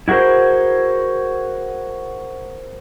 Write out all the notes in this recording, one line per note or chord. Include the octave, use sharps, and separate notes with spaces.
E4 F#4 G#4 A#4 C5